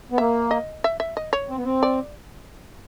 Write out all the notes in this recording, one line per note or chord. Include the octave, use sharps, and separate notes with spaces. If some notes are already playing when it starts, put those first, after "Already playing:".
B3
A#3 E5
D#5
E5
E5
D#5
C#5
C4
B3
C4
D5